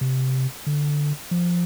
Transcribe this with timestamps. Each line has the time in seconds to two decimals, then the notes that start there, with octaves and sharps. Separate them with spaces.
0.01 C3
0.67 D3
1.31 F3